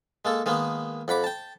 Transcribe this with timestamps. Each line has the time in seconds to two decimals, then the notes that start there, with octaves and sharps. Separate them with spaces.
0.25 G#3 A#3 A4
0.46 D#3 G#3 A#3 B3
1.08 F2 F#5 B5 D6
1.24 G5 A5